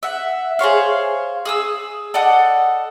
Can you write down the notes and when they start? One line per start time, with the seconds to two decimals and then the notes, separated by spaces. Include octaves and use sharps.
0.03 E5 F#5
0.59 G#4 C5 C#5 F5
1.45 G#4 D#6 E6
2.14 A4 D5 D#5 F#5